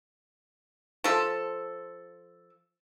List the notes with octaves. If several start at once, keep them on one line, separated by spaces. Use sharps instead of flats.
F3 A4